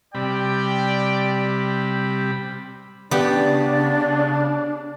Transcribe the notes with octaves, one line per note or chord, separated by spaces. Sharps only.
C3 G3 D5 G5 B5
C#3 B3 D4 G4 D5